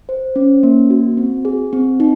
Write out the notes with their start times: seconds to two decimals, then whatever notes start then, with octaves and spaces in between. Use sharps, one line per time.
0.09 C5
0.36 C#4
0.63 A#3
0.90 F#4
1.17 C4
1.45 G#4
1.73 C4
2.00 D#4